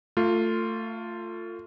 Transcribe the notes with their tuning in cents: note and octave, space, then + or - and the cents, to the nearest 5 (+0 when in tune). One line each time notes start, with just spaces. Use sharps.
A3 +25 F4 +0